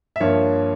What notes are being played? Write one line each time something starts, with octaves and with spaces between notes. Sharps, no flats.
E5
G2 F3 A#3 C#5